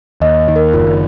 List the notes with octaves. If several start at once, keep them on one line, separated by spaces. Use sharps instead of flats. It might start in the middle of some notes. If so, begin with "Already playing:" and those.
D#2 D#5
D#3
A#4
F#1 F4